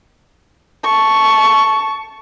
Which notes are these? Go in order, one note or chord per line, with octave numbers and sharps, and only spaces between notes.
A5 C#6